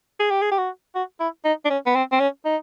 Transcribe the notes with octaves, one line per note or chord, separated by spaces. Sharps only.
G#4
G4
G#4
G4
F#4
F#4
E4
D#4
D4
C#4
B3
C4
C4
C#4
D#4